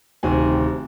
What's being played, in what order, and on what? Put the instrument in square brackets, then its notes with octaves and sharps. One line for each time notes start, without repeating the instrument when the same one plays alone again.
[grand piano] D1 C3 D#3 C4 G#5